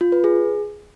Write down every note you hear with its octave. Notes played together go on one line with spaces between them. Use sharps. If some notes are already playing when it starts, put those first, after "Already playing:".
F4
B4
G#4